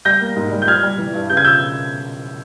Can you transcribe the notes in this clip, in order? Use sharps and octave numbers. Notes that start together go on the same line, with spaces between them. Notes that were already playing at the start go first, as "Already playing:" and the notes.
G3 G6 A#6
A#3
G#2
G3
G6
G3 F6 G#6
G3
E3
G2
C#3 G6
G#6
E6 G6